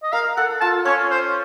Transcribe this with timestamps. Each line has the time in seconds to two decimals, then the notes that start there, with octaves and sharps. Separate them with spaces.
0.03 D#5
0.13 A#4 F5
0.37 A4 F#5
0.61 F4 A5
0.85 C#4 C#5
1.11 C5